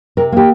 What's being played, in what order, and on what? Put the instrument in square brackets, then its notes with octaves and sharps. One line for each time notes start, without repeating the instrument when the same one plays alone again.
[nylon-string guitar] C3 A#4
A#3 G4